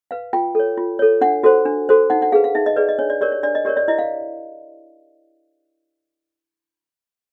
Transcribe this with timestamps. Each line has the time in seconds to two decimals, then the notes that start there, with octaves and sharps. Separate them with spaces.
0.11 B4 F5
0.33 F4 G5
0.55 A4 C#5
0.77 F4
0.99 A4 C#5
1.21 D4 F#5
1.43 F#4 A4 C5
1.66 D4
1.89 F#4 A4 C5
2.10 D#4 F#5
2.22 F#5
2.32 G#4 B4 F5
2.44 F5
2.55 D#4 E5
2.66 D#5
2.76 G#4 B4 D5
2.89 D#5
2.99 D4 C#5
3.10 D5
3.21 G4 A#4 C#5 D5
3.32 C#5
3.43 D4 D5
3.55 D#5
3.65 G4 A#4 C#5 D5
3.77 D5
3.88 E4 D#5
3.98 F5